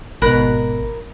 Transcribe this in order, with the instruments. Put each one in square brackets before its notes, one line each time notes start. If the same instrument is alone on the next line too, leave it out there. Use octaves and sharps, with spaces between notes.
[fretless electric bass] G#1 B2 [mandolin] A#4 B5 F#6